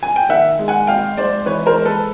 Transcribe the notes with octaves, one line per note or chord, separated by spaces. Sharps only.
G#5
G5
D#3 E5 F#5
G#3
F#5 G#5
G#1 F5 G5
G#2 C5 D5
E3 B4 C#5
A#4 C5
G#3
A4 B4